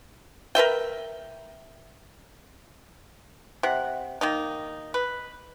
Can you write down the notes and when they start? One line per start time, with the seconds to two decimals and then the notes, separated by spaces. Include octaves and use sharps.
0.55 A#4 B4 E5 G5
3.63 C3 F#5
4.21 D#3 A#3 D#4
4.94 B4